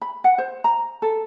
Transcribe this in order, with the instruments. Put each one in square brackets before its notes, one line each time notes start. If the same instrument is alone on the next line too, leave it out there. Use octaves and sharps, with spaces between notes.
[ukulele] B5
F#5
C5
A#5
A4